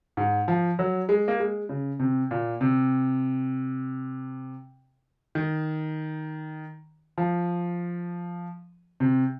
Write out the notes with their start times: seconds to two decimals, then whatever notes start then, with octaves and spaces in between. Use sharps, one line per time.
0.17 G#2
0.48 F3
0.79 F#3
1.09 G#3
1.28 A#3
1.40 G#3
1.69 C#3
2.00 C3
2.31 A#2
2.61 C3
5.35 D#3
7.18 F3
9.00 C3